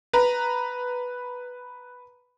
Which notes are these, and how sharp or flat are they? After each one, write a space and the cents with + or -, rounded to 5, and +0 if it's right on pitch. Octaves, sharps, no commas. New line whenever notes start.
B4 +0 A#5 +0